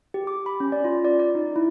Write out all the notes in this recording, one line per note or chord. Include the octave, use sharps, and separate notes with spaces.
G4
D6
B5
C#4
D5
F4
D5
D5
D#4
E4